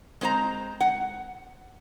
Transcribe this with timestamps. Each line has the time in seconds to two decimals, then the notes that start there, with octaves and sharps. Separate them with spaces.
0.21 G#3 C4 C5 F5 A#5
0.81 F#5